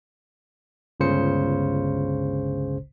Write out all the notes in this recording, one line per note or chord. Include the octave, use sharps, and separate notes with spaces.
G1 C#2 C#3 C5 C#7